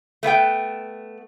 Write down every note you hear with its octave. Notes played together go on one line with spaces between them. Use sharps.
A3 B3 F5 G5